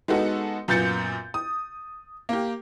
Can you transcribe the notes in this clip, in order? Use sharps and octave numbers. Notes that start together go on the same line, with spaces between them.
G#3 B3 D#4 F#4 A4
F#2 A#2 B3 G6 A6 C#7
D#6
A#3 G4